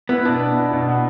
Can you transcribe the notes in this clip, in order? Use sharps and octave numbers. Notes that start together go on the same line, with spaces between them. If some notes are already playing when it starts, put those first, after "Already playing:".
B3 E4
B2 D4
B3
E4
B2
B3